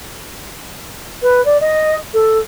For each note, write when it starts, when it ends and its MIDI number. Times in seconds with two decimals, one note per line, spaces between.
1.22 1.43 71
1.45 1.57 74
1.60 1.94 75
2.13 2.38 69